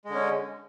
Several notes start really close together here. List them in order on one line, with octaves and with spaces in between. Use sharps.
G#3 D3 C#4